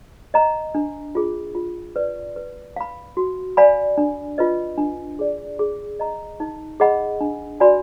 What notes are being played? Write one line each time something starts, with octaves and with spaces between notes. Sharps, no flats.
D#5 A#5
D4
F4 G#4
F4
B4 D5
B4
F5 B5
F#4
D5 F5 G#5 B5
D4
F4 B4 D#5
D4
G#4 D5
G#4
D#5 A#5
D#4
G#4 D#5 F#5 B5
D4
F#4 D5 G#5 B5